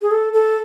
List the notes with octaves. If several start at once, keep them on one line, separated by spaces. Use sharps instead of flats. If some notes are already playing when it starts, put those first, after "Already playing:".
G#4
A4
A4